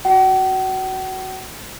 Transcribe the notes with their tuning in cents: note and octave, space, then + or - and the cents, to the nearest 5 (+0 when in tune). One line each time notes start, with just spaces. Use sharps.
F#4 +0 F#5 +45